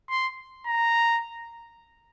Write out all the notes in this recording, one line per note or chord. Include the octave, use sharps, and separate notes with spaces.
C6
A#5